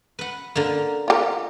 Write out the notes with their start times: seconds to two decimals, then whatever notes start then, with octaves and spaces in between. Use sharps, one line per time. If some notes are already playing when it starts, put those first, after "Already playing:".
0.19 B4 F#5
0.55 D3 A#3
1.08 F4 G4 A#4